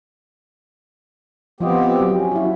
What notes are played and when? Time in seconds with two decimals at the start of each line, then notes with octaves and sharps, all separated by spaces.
1.60 F3 B3 C4 F4 G4 D#5
2.00 F#3
2.15 C#4
2.32 E4 F#4